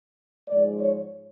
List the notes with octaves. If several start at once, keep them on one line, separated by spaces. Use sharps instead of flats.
G#2 F3 G#3 D5
C#5